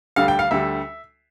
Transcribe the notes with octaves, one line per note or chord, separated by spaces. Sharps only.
D2 D3 G3 F5
G5
F5
D2 D3 G3 E5